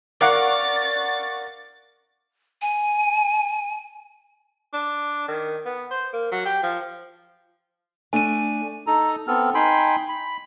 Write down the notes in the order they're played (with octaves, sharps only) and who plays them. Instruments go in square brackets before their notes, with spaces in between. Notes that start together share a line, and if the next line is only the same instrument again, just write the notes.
[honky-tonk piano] A#4 F5 D6 [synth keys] D5 F#5 C#6 [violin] A6
[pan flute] G#5
[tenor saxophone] D4
D#3
B3
C5
A#3
F#3
G4
F3
[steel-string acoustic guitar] A3 D4 [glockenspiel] G#5 D#7
[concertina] D#4 A4 A#5
B3 C4 A4 F6
D#4 G5 G#5 B5 C6
B5